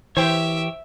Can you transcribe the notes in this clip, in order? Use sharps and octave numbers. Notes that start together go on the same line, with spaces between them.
E3 G4 C5 C#5 E5 G5